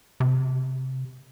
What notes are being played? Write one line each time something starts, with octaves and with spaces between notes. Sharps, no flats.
C3